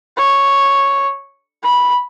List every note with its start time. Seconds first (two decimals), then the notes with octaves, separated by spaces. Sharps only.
0.17 C#5
1.63 B5